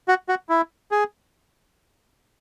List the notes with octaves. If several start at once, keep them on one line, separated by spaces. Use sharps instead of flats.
F#4
F#4
E4
G#4